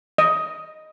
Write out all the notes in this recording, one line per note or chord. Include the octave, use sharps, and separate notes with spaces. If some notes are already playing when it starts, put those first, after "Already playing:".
D#5